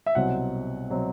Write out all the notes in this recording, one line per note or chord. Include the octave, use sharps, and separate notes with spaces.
E5
C2 B2 F#3 C4 F#5
B2 F#3 C4